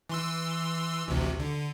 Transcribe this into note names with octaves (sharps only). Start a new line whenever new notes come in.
E3 C6 E6
A1 D2 C3
D3